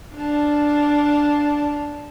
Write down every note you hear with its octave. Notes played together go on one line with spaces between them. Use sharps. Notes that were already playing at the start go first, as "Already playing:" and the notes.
D4 F5 A5